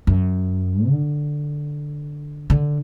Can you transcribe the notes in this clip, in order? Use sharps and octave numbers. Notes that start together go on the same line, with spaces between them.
F#2
D3
D3